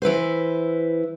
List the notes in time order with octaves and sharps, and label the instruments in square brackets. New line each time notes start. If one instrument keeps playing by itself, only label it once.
[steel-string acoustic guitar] E3 E4 B4 C5